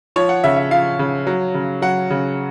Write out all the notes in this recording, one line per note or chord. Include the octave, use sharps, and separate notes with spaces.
F3 C#5
F#5
C#3 E5
E5
F3 F5
C#3
F#3
C#3
F#3 F#5
C#3